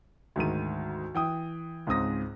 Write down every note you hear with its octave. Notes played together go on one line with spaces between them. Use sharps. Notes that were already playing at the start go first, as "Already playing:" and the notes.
D2 G#2 D#3 D#7
E3 G5 D#6
C#2 G#2 C4 D#6 A#6